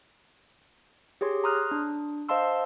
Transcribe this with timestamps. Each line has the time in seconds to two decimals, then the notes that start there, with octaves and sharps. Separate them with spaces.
1.21 G4 G#4 C#5 C6
1.44 A#5 C6 D#6 F6 F#6
1.71 D4
2.29 C5 D#5 F5 A5 C6 E6